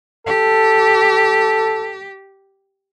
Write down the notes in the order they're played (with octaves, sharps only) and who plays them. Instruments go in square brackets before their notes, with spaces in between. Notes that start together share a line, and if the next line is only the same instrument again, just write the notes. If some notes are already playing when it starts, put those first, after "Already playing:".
[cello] G4 [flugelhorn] A4